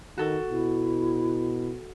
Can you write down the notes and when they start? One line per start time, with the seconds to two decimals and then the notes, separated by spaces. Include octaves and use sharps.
0.18 D#3 F#4 A4
0.50 B2 E4